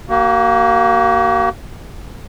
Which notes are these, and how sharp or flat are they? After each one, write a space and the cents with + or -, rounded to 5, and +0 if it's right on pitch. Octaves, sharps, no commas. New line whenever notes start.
A#3 +0 F#4 +45